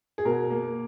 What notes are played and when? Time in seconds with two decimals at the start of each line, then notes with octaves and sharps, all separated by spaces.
0.18 G#4
0.25 B2 A#4
0.50 A#3